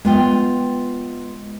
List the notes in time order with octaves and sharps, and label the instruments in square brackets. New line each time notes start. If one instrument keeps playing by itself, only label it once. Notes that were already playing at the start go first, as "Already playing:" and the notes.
[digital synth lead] G#3 [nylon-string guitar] B3 F4 G5